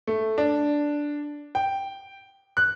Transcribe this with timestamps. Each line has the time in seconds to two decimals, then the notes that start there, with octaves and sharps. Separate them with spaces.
0.07 A3
0.38 D4
1.55 G5
2.57 F#6